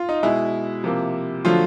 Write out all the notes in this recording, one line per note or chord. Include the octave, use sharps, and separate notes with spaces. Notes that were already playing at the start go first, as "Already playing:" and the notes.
Already playing: F4
D#4
B2 G#3 E4
C3 F3 A#3
D3 F3 F#3 A3 F4